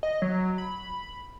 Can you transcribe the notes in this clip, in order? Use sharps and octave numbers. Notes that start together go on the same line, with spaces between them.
D#5
F#3
B5